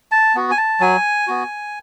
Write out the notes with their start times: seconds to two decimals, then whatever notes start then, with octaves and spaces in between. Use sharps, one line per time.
0.12 A5
0.35 B3 F#4
0.51 G#5
0.58 A5
0.80 F#3 G#5
1.27 B3 F#4